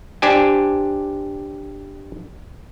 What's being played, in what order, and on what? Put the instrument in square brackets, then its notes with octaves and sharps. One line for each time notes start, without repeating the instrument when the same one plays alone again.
[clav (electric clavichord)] D4 G4 C5 G#5